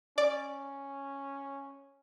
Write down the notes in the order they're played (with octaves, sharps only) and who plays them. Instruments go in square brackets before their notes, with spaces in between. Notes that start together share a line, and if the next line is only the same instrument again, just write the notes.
[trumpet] C#4 [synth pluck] D5